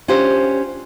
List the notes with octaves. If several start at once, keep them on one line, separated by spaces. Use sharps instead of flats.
C#4 D4 F4 G4 C5